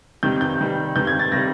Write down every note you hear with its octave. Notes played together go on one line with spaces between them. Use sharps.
C3 D#3 G3 G6
G6
C3 D#3 G3
C3 D#3 G3 G6
G#6
A6
C3 D#3 G3 A#6